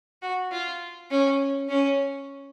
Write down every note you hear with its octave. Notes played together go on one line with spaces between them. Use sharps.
F#4
F4
C#4
C#4